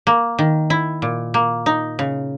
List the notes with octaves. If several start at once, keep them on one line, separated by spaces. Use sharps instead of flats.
A#3
D#3
E4
A#2
A#3
D#4
C#3